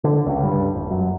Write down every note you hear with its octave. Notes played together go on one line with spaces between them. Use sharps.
D3
C#2
G2
D#1
F#2